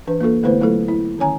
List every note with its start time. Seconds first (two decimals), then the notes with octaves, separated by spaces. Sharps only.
0.07 E3 D4 B4
0.20 A#3 D4 F4 A4
0.43 D3 A3 B3 E4 B4 C5
0.60 F#3 A3 E4 F4 A4
0.88 E4
1.18 D3 D#3 C#4 C#5 G#5 A#5